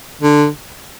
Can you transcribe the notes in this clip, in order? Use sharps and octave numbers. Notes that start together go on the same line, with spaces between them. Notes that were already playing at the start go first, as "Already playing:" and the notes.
D3